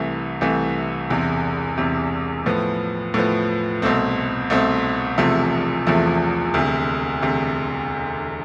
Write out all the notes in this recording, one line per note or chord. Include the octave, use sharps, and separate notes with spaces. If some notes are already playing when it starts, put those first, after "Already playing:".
Already playing: C2 C3 E3 A3
C2 C3 E3 A3
E1 E2 C3
E1 E2 C3
A2 F3 B3
A2 F3 B3
C2 B2 A3 C4
C2 B2 A3 C4
E1 E2 C3 F3 A3
E1 E2 C3 F3 A3
E1 D2 C3
E1 D2 C3